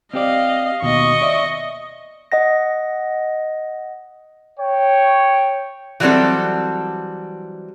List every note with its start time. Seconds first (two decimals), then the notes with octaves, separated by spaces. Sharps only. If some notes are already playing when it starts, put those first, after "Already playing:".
0.14 C4 G4 D5 D#5 F5
0.82 D#2 B2 D#5 C#6
1.22 D5 E5
2.32 D#5 F#5 A#6
4.60 C#5 G5
6.00 E3 F#3 G3 A3 C4 A4